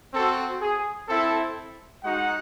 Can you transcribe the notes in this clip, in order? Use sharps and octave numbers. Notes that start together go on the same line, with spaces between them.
C4 F#4 A4
G#4
C4 E4 A4
G#3 D#4 F#4 F#5